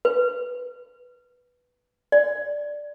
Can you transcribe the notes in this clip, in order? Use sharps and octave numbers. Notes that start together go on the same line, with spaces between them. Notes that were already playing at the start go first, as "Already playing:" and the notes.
B4
D5